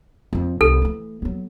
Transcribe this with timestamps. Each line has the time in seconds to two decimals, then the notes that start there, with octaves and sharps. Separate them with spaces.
0.33 F2 F4
0.61 C2 A4
0.82 E3 A3
1.22 F#3 B3